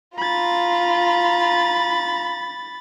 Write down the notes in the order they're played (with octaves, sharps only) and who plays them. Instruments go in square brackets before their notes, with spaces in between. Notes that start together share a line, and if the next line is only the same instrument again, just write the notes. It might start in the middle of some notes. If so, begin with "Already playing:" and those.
[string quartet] F4 A#5 [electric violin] B5 A6